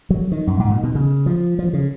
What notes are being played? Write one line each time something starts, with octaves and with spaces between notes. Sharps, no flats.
F#3
D#3
F#2
G#2
A#2
B2
C#3
F3
F3
C#3